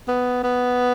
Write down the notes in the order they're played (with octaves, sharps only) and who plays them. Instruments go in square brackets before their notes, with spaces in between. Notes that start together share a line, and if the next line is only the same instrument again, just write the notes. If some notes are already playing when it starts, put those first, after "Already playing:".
[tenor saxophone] B3
B3